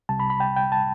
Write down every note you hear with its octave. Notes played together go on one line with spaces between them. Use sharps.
C2 C3 G3 A5
B5
B5
G5
G5
A5